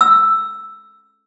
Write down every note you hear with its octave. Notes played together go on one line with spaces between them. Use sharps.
E6